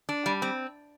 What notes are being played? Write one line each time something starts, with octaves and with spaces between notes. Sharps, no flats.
D4
G3
C4